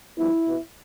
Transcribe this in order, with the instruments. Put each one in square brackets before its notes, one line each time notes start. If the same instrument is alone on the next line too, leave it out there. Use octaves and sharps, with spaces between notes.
[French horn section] G2 F3 B3 E4
B2 B3